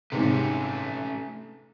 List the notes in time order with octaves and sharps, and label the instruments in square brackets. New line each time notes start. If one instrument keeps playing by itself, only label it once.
[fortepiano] G#2 C3 [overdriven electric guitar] A3 C#4